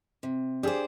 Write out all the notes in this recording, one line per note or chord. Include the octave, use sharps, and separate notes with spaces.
C3
D4 G4 G#4 C5